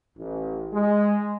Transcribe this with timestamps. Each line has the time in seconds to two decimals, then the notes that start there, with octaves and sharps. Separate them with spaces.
0.16 A1
0.72 G#3